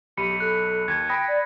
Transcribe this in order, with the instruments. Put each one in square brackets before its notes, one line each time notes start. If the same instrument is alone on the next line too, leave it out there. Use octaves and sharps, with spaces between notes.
[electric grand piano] B1 B5 [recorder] G4 [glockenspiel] C#7 D#7
[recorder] A4 [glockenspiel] F#6
[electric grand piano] D#2 [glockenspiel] G#6
[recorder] G5 [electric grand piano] B5 D#6 A#6
[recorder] D5